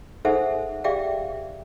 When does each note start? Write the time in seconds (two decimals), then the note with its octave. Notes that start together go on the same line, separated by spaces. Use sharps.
0.25 D#4 G#4 A4 C5 E5 F#5
0.84 G4 G#4 D5 E5 F5 G5